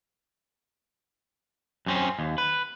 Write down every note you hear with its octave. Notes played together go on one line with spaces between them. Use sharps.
F#2 C4 C#4
D#2
B4